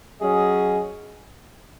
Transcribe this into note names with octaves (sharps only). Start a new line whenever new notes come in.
F#3 C#4 G#4 D#5